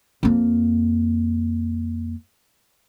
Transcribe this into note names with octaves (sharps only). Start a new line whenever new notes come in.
F2 A#3